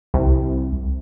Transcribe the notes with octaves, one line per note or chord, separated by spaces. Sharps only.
C2